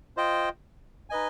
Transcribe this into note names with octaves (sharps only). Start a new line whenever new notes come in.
F4 C5 D#5 G5
D#4 B4 D#5 G#5